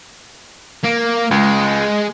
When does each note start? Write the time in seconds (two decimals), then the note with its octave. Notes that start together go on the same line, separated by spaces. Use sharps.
0.84 A#3
1.31 C#2 G#3